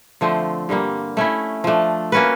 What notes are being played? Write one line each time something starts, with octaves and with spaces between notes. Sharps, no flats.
D3 F3 A3 C4
G2 D3 G3 A#3
A3 C#4 E4
F3 A3 D4
A#3 C#4 F#4 B4